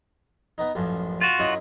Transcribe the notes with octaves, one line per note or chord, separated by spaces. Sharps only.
B3 D#4
A1 F#2 F3
F4 F#4
F#2 D#4 E4